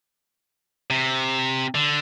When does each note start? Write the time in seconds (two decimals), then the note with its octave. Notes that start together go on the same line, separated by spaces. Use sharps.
0.90 C3
1.75 D3